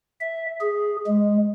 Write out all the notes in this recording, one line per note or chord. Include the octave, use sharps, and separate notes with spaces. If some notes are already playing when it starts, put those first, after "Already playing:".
E5
G#4
G#3